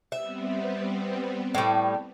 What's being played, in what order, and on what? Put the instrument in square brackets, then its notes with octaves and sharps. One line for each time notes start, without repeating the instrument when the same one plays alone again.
[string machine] G3 B3 C4 [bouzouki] E5
[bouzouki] A2 G3